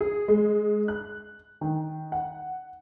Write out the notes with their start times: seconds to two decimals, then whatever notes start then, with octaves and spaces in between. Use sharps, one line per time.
0.01 G#4
0.28 G#3
0.88 F#6
1.61 D#3
2.12 F#5